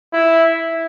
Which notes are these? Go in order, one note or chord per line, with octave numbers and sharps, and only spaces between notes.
E4